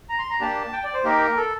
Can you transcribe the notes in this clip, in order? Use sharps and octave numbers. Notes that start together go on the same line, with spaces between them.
A#5
C6
A#5
A#3 D4 G4 A5
G5
D5
C5
A#3 D#4 G4 A#4
A4